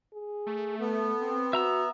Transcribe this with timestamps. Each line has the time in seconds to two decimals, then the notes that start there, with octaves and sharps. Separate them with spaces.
0.13 G#4
0.46 A3
0.79 B3 A4
1.21 C4
1.53 F#4 E5 A#5 E6